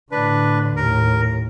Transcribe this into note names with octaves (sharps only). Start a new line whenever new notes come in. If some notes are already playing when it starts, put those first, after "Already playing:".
A2 D3 D4 B4
D#2 A2 A#4